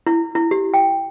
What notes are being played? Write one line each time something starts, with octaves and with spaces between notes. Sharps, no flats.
E4
E4
G4
G5